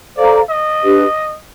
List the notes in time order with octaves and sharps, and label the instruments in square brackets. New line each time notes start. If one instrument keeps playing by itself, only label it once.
[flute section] A4 C5 F5 A#5 [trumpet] D5
[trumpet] D#5
[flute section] D4 G4 B4